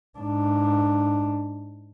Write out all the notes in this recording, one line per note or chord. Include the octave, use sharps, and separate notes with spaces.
G#2 D4